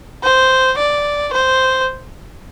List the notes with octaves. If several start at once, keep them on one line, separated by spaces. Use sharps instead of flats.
C5
D5
C5